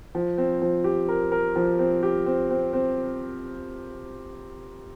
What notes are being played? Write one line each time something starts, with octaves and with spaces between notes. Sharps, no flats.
F3
C4
F3
G4
A#4
A#4
F3
C4
G4
C4
C4
C4